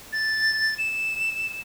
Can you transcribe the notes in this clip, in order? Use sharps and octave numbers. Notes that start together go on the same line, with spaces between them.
A6
E7